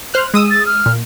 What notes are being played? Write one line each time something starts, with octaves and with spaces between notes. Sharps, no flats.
C5 F6 F#6
G#3 D#6 E6
A6
F6
A#2